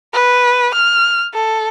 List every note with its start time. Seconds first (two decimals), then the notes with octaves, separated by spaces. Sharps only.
0.13 B4
0.74 F6
1.34 A4